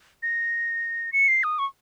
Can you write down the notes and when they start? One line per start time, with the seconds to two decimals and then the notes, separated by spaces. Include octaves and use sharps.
0.23 A#6
1.13 C#7
1.28 C7
1.44 D#6
1.59 C#6